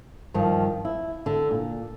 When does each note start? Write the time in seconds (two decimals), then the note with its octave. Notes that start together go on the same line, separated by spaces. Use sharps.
0.34 G2 D#3 F3
0.85 E4
1.26 D3
1.51 A#2